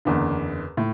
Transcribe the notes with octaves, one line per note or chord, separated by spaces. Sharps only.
F#1 E2 D3
A2